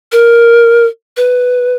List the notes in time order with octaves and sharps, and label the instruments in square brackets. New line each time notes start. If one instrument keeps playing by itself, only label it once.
[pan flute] A#4
B4